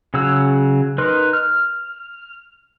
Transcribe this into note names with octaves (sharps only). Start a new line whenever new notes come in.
C#3 F#3 E6
D#4 A#4 B4 C6
F6